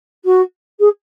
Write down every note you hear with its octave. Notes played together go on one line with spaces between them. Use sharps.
F#4
G#4